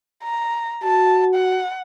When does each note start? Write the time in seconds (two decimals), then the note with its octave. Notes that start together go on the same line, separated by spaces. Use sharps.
0.23 A#5
0.84 F#4 A5
1.35 F#5